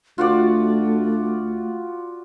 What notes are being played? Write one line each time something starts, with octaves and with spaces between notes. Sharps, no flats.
D2 A3 F4 F#4 D5